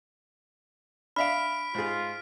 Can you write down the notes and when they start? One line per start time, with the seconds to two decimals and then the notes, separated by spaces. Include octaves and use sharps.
1.16 D4 E5 F5 B5 F6 B6 D7
1.74 G#2 F4 G#4